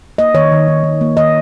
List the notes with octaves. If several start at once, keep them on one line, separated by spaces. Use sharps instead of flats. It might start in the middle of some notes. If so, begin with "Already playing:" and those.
A#3 D#5
D#3 C#5
D#3
D#3
D#3
A#3
D#3 D#5